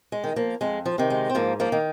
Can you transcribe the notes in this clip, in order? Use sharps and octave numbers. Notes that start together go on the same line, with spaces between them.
G#3
D#3
F3 A#3
F2 G#3
F3
C3 D#3
G#3
C4
G#2 F3 A#3
F3 A#3
D#3